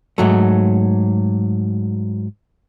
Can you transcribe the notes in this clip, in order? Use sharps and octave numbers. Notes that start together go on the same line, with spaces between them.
G#2 F#3 A3